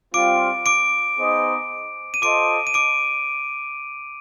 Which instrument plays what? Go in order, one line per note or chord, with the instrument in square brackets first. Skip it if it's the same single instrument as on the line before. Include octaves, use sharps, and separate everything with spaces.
[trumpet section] G3 C4 F4 [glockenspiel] D6 D7
[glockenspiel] D6 D7
[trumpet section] B3 D#4 G#4 C5 D#5
[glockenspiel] D#7
[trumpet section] F4 A4 C5 D#5 [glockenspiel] D6 D7
[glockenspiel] D#7
D6 D7